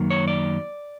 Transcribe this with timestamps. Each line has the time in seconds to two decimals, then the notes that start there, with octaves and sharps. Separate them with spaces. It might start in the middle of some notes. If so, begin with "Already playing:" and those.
Already playing: F#2 D#3 F#3 A#3
0.10 C#5
0.28 D5